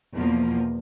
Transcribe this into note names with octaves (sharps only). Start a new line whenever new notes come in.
E2 B2 F3 A#3